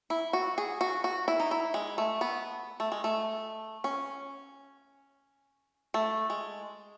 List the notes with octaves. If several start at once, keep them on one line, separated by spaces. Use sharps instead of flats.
E4
F#4
G#4
F#4
F#4
E4
D#4
E4
G#3
A3
B3
A3
G#3
A3
C#4
A3
G#3